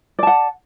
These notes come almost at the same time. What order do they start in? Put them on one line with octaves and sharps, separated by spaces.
D5 A5 F#5